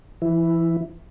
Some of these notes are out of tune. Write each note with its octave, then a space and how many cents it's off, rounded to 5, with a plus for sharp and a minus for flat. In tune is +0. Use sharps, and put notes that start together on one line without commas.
E3 +40 E4 +0